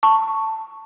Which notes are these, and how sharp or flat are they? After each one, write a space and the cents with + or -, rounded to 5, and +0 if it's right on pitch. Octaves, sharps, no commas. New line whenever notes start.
A5 +10 C#6 +0